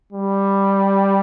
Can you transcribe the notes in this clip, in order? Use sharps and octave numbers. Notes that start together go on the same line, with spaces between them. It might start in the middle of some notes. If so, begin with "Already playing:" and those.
G3